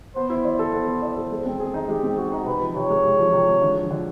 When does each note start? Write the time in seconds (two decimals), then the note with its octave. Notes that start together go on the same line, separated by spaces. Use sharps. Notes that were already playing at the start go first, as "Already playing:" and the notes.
0.15 B3 C5
0.30 E4
0.44 C5 D5
0.59 A4
0.73 B3
0.88 E4
1.02 D5
1.17 A4
1.32 G#3
1.46 C4
1.60 G#4
1.74 D#4
1.89 G#3 G4
2.03 C4
2.17 F#4 G#4
2.32 D#4
2.46 C3 B4
2.61 F3
2.76 C3 C#5
2.90 G#3
3.04 C3
3.19 F3
3.33 C3
3.48 G#3
3.62 D3
3.76 F3
3.91 D3